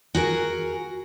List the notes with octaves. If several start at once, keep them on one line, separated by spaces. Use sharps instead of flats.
F#4 G#4 A#4